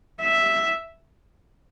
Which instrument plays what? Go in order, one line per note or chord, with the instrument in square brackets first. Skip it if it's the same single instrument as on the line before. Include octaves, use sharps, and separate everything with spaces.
[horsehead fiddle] E5